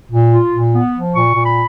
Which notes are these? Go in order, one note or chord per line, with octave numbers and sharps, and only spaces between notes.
A#2
F4
A#2
B3
F3
A#2 C#6
A#2
B5